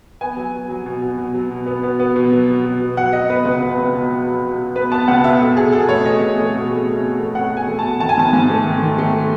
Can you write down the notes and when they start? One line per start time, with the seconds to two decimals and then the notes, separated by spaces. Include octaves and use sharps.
0.21 B3 G#5
0.37 F#3
0.53 F#3
0.70 F#3
0.86 B2
1.02 B2
1.18 B2
1.34 F#3
1.51 B2
1.66 B3
1.83 B3
2.00 B3
2.16 B2
2.32 F#3
2.48 F#3
2.64 B2
2.81 B2
2.97 F#3 F#5
3.12 F#3 D#5
3.29 B3 B4
3.45 C#2 B4
3.62 B2
3.77 C#2
3.95 B2
4.10 B2
4.27 F#3
4.43 B2
4.59 B2
4.75 B3 B4
4.91 B3 A5
5.08 C#2 F#5
5.24 B2 E5
5.40 B2 A4
5.56 B2 G#4
5.72 B2 A4
5.89 A3 C#5
6.05 A3 D#5
6.22 B2
6.38 A3
6.55 B2
6.71 A3
6.87 A3
7.03 A3
7.19 A3
7.35 A3 F#5
7.51 B2
7.57 G#5
7.68 A3
7.79 A5
7.85 B2
8.00 D#3 A5
8.09 G#5
8.17 G#2 A5
8.33 G#2
8.50 A3
8.66 D#3
8.82 D#3
8.98 A3